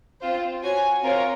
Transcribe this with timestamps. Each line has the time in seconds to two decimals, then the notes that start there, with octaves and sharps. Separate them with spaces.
0.22 C4 F4 C5
0.63 F#4 C#5 G#5
1.04 C4 F4 A#4 C#5